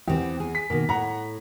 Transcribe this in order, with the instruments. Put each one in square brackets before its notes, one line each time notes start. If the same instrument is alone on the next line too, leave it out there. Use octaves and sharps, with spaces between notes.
[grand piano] E2 [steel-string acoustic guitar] B3 C4 G4
[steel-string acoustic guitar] G#4
[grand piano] B6
[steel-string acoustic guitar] B2 D#3 [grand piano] A#3
[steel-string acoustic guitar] A2 [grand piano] F#5 A#5